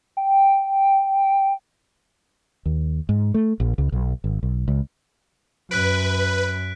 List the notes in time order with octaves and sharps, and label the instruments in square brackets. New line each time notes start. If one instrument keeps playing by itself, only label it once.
[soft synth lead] G5
[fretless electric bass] D#2
G#2
A3
A#1
C#2
B1
G#1
B1
C#2
[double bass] F#2 [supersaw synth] B4 [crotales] F#6 B6 D7